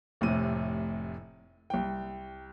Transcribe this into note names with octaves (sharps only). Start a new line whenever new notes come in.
F1 A2 C3 D#7
C2 G5